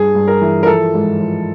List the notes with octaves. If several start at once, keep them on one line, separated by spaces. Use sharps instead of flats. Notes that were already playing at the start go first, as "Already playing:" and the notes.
Already playing: G2 G#4
G2
A#4
E3
A#4
F3 A4
G#2
F3